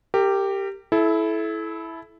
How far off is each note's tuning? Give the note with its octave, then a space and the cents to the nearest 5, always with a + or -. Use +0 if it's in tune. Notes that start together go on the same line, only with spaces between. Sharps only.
G4 +0 A#4 -35
E4 +0 A4 -30